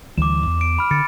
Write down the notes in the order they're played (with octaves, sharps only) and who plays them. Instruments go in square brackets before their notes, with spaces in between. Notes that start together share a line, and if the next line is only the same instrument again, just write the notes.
[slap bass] D2 E3 G3 [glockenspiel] D6 E7
[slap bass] E2
[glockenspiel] D7
B5 F6
[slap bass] D3 [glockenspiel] A6 C#7